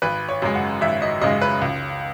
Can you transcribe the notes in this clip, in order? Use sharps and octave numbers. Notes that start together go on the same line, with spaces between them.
G#1 B4
C#5
F#2 C#3 G#3
F#5
G#1 E5
D#5
F#2 C#3 G#3 D#5
B4
C#2